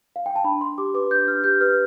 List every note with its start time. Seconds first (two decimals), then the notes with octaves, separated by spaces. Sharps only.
0.16 F5
0.26 G5
0.36 A5
0.44 D4 B5
0.61 D4 C6
0.78 G4 D6
0.94 B4 D6
1.11 D4 G6
1.27 D4 F6
1.44 G4 G6
1.61 B4 F6